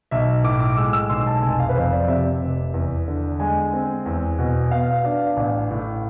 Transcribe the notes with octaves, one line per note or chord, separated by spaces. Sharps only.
B1 E5
A2 D6
D6
G#3 E6
E6
B1 C6
A5
F1 G#5
F5
B4
F2 C5
D5
C3 E5
F1
E2
D3
G#3 G#5
C4
E2
B2
B3 F5
D4 F5
A1
A2